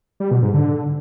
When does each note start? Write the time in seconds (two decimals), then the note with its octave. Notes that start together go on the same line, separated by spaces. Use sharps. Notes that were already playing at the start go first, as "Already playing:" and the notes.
0.20 G3
0.31 B2
0.42 G#2
0.54 D3